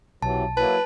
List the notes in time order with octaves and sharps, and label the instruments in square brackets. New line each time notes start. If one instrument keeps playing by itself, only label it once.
[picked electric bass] B1 [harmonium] C3 E3 F#3 [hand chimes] A5
[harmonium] F#3 A#3 E4 [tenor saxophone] B4 [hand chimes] A5